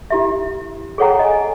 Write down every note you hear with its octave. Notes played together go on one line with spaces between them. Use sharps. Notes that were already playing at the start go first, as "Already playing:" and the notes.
E4 G4 E5
G#4 A4 C#5 F#5 G5 A#5
D#5 G#5